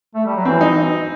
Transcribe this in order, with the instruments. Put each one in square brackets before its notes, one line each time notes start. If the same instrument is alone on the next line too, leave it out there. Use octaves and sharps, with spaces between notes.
[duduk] A3
G3
F#3
[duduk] E3 [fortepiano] C4
[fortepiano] D#4